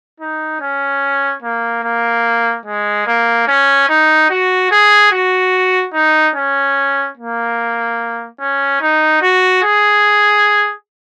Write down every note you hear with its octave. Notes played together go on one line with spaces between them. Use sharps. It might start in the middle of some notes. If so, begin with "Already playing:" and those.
D#4
C#4
A#3
A#3
G#3
A#3
C#4
D#4
F#4
G#4
F#4
D#4
C#4
A#3
C#4
D#4
F#4
G#4